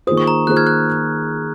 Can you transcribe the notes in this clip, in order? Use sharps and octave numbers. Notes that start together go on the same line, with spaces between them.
D#3 A#3 F4 G#4 C5 D#6
C#6
A#5
D#3 A#3 F4 G#4 C5 F#6
F6 G#6
F#6